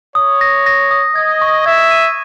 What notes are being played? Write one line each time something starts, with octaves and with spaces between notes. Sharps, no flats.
C#5 D#6
A#6
A#6
D#6
D#5 G#6
C#6
E5 G#6
D#7